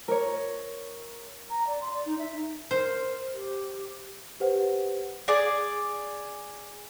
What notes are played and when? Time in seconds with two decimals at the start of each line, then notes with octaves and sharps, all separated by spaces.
0.08 A#4 C#5
1.50 A#5
1.67 D5
1.81 C6
1.93 D5
2.06 D#4
2.18 E5
2.34 D#4
2.71 A#4 C5
3.34 G4
4.40 G4 B4 C5 F#5
5.28 G#4 D5